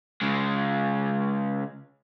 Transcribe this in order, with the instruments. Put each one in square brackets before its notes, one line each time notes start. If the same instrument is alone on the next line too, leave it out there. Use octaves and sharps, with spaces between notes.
[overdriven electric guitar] C#3 G#3